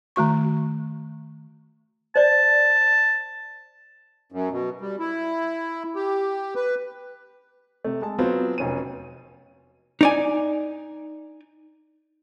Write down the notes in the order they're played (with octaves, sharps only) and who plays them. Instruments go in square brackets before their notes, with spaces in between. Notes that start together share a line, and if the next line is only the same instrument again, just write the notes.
[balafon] D#3 A3 F#4 C#6
[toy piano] C5 D5 [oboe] A5
[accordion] F#2
B2
G3
E4
G4
B4
[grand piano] C3 A3
G#3 A5
F#3 B3 C4 F4
F1 C#4 D#7
[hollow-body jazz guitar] D#4 D5 G#5